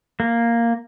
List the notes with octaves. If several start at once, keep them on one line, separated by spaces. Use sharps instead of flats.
A#3